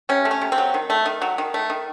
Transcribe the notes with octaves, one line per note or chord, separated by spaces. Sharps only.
C3 C#4
A3
C#4
C3
C4
F#3
D#3
A3
D#3
F#3
D#3
A3
D#3